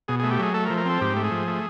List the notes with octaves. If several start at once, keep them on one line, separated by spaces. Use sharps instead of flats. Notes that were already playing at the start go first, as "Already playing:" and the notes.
B2 G#4
A3 G#4
G4
F#3 G#4
A3 A4
A#4
F3
A#4
C4 A4
G#2 G4
A3
G#4
F3
A3